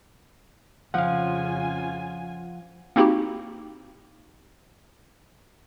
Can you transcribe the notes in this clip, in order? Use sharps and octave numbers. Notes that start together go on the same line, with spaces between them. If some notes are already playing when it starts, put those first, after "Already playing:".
F2 C#3 F3 C#4 F4 F5 F#5 G#5
A#3 C4 D#4 E4 F#4 G4